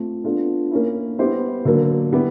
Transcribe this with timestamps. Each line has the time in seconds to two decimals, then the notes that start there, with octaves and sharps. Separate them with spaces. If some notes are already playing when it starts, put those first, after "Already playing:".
Already playing: A3 C4 F4 A4
0.24 B3 D4 F4 A4
0.71 A#3 C#4 E4
1.19 G3 B3 E4 G4 C5
1.65 D3 F#3 A#3
2.12 G3 B3 E4 G4